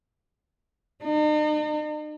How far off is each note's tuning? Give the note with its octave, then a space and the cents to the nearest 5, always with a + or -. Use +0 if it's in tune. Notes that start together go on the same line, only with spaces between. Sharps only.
D#4 -45